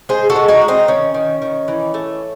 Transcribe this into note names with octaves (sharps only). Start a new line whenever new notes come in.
G#3 G#4 C5
F#4 A4
G#3
D#4 F#4
G#3
C4 D#4
D#3 C#4
D#3
D#3
E3
A3